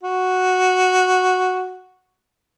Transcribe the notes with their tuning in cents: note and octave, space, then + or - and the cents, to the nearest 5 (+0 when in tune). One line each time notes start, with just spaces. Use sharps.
F#4 -5